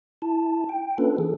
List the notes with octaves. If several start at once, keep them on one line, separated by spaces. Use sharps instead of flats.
E4 A5
G5
A#3 C#4 D4 F4 A4 B4
E3 G#4 A4